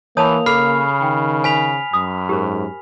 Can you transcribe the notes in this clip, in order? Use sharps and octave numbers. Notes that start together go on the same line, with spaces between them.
E3 A#3 C#5 A5 B5 D#6 F7
C#3 A4 B5 D6 F6 C7
D#3 G5
C5 G#5 B6 F7
F#2 D#6
G#2 G4 A#4 C5